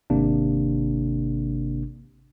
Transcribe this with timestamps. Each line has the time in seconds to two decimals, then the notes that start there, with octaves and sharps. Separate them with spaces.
0.10 G#1 C3 A#3 D4